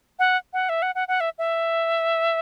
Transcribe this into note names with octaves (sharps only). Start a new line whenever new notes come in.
F#5
F#5
E5
F#5
F#5
F#5
E5
E5